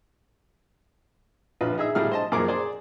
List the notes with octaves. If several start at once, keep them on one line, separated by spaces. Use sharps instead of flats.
A#1 F4 B4
D#4 G#4 E5
A2 G3 E4 F4 G#4 F6
C5 D#5 A5
F#2 A#2 F3 G#4 A#4 D6
G#4 C5 D5